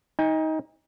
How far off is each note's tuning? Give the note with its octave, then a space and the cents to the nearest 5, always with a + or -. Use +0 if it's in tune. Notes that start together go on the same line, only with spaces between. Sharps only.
D#4 +20 G#5 -45